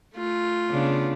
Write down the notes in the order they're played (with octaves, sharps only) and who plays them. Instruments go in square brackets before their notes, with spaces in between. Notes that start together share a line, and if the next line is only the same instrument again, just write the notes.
[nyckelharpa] A3 F4
[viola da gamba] C#3 B3 D4